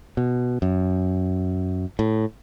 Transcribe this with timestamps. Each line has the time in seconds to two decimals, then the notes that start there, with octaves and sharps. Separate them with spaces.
0.17 B2
0.62 F#2
1.99 A2